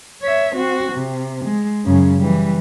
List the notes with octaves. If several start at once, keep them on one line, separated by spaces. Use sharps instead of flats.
C#5 E5
C4 F#4
C3
G#3
F#2 C#3
E3 G3